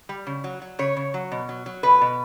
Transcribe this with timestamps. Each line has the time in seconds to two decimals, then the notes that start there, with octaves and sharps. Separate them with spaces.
0.09 G3
0.27 C#3
0.44 F#3
0.62 F#3
0.79 C#3 C#5
0.97 C#3
1.14 F#3
1.32 B2
1.49 F#3
1.66 F#3
1.83 B2 B4
2.01 B2